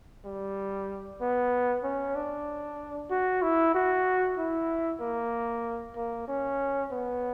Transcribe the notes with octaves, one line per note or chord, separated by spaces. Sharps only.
G3
B3
C#4
D4
F#4
E4
F#4
E4
A#3
A#3
C#4
B3